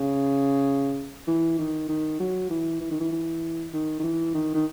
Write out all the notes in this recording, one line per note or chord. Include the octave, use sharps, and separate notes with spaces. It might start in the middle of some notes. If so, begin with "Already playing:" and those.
Already playing: C#3
E3
D#3
D#3
F#3
E3
E3
D#3
E3
E3
D#3
D#3
E3
D#3
D#3